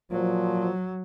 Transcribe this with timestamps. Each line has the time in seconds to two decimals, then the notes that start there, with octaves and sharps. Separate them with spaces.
0.11 A#2 F3 F#3